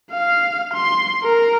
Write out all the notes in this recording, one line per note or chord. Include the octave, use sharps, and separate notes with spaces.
F5
C6
A#4